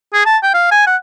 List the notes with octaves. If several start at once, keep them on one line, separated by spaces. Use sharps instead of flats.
G#4
A5
G5
F5
G#5
F#5